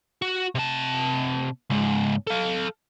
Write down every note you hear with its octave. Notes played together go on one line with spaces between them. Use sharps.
F#4
C3 A5
C#2 G#2
A4 F5